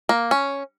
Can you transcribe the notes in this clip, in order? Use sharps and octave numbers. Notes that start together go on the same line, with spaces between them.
A#3
C#4